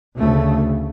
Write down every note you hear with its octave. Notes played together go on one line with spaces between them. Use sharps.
D2 C#3 A3